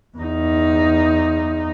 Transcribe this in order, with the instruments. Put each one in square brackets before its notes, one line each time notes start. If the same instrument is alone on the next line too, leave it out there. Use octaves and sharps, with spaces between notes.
[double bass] E2 D#4